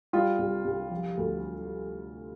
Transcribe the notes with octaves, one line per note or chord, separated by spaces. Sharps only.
G3 F4
C2
C2
F3
D2